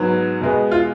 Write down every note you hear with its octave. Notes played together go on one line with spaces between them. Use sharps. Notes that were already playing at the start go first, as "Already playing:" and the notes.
Already playing: G#2 F#3 B3
B2 G#3 B3
F4